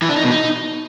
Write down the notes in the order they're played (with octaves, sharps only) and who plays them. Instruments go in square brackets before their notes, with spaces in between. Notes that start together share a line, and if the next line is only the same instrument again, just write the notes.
[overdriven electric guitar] E3
D4
D#4
B2
D#4